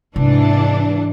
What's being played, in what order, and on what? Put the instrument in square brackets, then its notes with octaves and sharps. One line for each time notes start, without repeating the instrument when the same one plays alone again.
[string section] G#2 E3 D4 [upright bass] C3